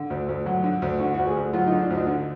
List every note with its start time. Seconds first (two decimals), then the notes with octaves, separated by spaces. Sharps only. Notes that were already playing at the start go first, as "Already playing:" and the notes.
Already playing: D3
0.10 D2
0.29 D2
0.46 F#3
0.64 D3
0.82 D2
0.99 D3 F#4
1.14 F#4
1.19 D2
1.27 G#4
1.36 D2
1.53 F#3 F4
1.67 D#4
1.72 D3
1.81 D4
1.90 D2 D#4
2.07 D3